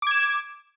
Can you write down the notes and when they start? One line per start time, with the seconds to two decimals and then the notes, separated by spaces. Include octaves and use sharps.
0.02 D6
0.07 G#6
0.11 E7